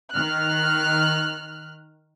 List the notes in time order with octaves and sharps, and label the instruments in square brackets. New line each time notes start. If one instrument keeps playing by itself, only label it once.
[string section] D#3 F6 F#6